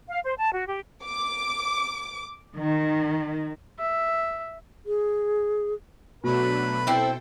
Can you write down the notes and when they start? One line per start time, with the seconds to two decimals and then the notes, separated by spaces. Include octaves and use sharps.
0.09 F5
0.24 C5
0.39 A5
0.52 F#4
0.68 G4
1.05 D6
2.56 D#3
3.79 E5
4.86 G#4
6.24 B2 F#3 A3 D4 B4
6.87 C4 E4 A4 C5 G5